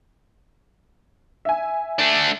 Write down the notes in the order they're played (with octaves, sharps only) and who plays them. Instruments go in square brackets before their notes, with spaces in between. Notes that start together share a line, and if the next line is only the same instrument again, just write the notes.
[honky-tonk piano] E5 G#5
[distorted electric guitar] A3 D4